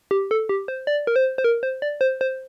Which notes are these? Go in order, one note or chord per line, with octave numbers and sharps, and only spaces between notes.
G4
A4
G4
C5
D5
A#4
C5
C5
A#4
C5
D5
C5
C5